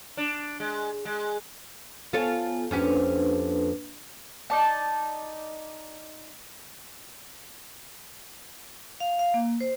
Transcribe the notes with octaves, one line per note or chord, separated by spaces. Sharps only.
D4
G#3
G#3
B3 F4 A4 C#5 G#5
F2 A#3 C#4 D4 G4 B4
D#4 D5 A5
F5
F5
A#3
C5